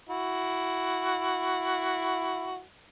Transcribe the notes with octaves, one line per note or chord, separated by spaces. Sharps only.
E4 F#4